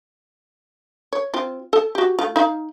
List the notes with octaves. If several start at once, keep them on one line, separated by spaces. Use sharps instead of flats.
C#5
C4 F4
A4 A5
F#4 G4
A3 F4
D#4 F5